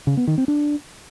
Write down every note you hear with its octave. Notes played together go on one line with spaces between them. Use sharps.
C#3
B3
D#3
C4
D4